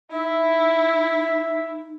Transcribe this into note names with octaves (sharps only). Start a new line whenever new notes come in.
D#4 E4 E5